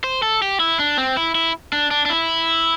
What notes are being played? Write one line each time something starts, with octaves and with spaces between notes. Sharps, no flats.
C5
A4
G4
E4
D4
C4
E4
E4
D4
D4
D4
E4